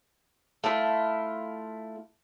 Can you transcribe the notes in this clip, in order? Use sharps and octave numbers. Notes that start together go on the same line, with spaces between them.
A3 E4 F4